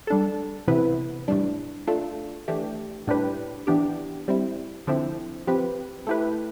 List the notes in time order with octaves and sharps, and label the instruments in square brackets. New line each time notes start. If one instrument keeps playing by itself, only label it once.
[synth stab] G3 D4 A4
C3 E3 B3 E4 B4
A2 E3 G3 D4
A3 D4 F4 A4
E3 A3 D4 G4
A2 G3 D4 G4 B4
E3 B3 D4 G4
G3 C4 E4
D3 F3 C4 E4
F3 C4 G4 B4
A3 E4 G4 B4